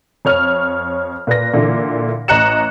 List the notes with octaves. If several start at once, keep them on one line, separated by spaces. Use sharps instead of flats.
F2 C#5 F6
A#2 B4 D5 A#6
A#2 D3 E3
A1 D#5 A#5 F#6 C#7 E7